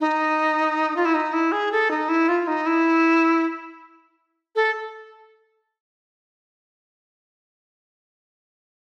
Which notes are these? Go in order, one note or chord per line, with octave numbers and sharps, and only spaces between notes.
D#4
F4
E4
D#4
E4
G#4
A4
D#4
E4
F4
D#4
E4
A4